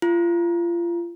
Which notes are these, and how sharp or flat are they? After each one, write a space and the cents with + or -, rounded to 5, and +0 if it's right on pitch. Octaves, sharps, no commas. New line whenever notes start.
F4 -30